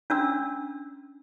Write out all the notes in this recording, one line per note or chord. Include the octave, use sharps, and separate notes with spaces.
C#4 D4 E6